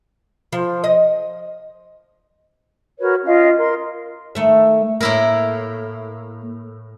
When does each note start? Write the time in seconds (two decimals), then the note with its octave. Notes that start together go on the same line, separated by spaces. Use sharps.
0.52 F3
0.84 D#5
2.99 F#4 A#4 B4 C#5
3.25 C#4 F4 D#5 F5
3.58 A#4 C6
4.35 D#3 A3 E5
5.01 A2 A#3 E4 A#4